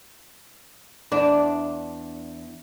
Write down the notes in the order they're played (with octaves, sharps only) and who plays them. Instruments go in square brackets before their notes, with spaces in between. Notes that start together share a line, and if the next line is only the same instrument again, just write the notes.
[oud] E2 D4